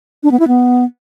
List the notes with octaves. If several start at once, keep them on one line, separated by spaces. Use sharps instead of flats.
D4
B3
E4
B3